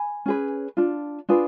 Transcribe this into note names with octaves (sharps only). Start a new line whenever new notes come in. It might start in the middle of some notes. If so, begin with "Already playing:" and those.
Already playing: G#5 B5
C#4 G#4 B4
D4 F4
D4 F4 G#4 B4